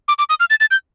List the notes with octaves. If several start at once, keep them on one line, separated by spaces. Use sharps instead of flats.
D6
D6
D#6
F6
A6
A6
G6